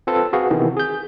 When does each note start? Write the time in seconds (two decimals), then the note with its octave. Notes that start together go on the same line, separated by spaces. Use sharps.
0.07 C4 F4 A4 B4
0.33 F#4 G#4 B4 F5
0.50 C3 D#3 E3 B3
0.77 G#4 G6